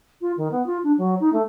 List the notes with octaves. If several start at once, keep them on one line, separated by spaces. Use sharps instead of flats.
F4
D#3
B3
F4
D4
F#3
D#4
A3